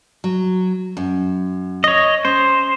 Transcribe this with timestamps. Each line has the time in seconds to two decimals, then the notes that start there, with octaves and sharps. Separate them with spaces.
0.24 F#3
0.97 F#2
1.84 C#5 D#5
2.25 C#4 C5